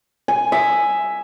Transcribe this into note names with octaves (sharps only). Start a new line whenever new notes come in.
G#5
E5